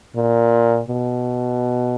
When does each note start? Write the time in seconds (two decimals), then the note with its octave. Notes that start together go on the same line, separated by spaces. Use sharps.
0.16 A#2
0.88 B2